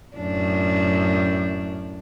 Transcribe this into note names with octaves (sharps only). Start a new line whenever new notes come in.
F#2 A2 D4